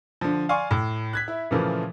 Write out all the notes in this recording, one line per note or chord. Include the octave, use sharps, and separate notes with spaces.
D3 F3
D5 F5 G#5 C6 C#6
A2
F#6 G#6 B6
E4
A#2 C#3 E3 F3 A3